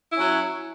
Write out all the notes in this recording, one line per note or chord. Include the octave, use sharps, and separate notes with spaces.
F#3 C#4 E4